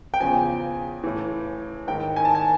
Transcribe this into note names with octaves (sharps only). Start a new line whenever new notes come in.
G5
E2 C#3 F3 G#5
A2 E3
G#2 D#3 G5
G#5
A5
G#5